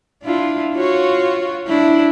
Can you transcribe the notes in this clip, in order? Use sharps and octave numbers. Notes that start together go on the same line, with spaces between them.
D4 E4 F4
F4 F#4 C#5
D4 E4